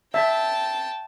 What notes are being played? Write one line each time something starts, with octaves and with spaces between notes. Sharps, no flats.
E5 G5 A5